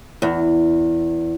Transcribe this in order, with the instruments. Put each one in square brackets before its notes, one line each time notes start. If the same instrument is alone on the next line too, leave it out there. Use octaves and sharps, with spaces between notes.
[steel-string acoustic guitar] E2